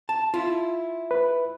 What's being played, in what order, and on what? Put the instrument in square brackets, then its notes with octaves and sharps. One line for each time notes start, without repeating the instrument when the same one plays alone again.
[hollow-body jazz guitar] A5
E4 F4
[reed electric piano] B4